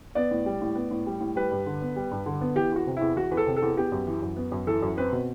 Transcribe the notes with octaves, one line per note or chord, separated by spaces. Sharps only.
B3 D5
A2
G3
A2
B3
A2
G3
A2
G3 B4
G2
D3
B3
G3
G2
D3
B3
E3 G4
E2 F#4
C3
E2 E4
E3 F#4
E2 B4
A4
C3
A4
E2
B3 G4
F#2
E3
F#2
B3
F#2
E3 A4
F#2
C4 B4
B2